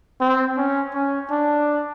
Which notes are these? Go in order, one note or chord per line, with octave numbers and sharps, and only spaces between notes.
C4
C#4
C#4
D4